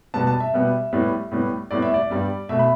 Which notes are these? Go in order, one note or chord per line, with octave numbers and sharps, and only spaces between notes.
B2 G3 B3 A5
A5
E5
B2 G3 B3
A2 G3 B3
A2 G3 B3
A2 G3 B3 D5
E5
D5
G2 G3 B3
B2 A3 E5
B5